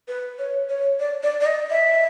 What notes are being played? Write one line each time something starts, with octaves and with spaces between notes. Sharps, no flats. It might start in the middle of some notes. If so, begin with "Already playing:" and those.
B4
C#5
C#5
D5
D5
D5
D#5
E5